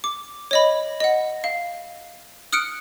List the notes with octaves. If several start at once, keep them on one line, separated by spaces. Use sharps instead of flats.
D6
C#5 D#5 B5
D#5 F#5
F5
D#6 F6 F#6 C#7 D7